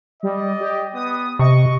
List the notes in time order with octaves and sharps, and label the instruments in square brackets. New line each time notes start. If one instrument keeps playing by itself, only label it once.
[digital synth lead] G3 [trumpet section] D5 D#5
[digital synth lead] G4
[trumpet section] B3 [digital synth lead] D#6
[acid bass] C3 [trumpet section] D#5 [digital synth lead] C#6